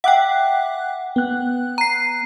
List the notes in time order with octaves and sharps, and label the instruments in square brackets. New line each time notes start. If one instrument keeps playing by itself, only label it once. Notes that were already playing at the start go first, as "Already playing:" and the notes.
[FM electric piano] E5 D6 F#6 [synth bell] F#5 G5
[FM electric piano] B3 F#6
[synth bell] A#5 C7